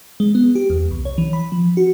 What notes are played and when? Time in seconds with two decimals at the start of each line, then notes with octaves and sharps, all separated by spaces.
0.20 G#3
0.35 B3
0.55 G4
0.70 E2
0.91 C2
1.05 C#5
1.18 E3
1.33 B5
1.52 F3
1.77 F#4